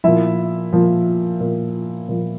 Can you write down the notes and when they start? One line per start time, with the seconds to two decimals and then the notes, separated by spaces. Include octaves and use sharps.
0.04 A#2 F3 E4 E5
0.73 A#2 F3
1.40 A#2 F3
2.09 A#2 F3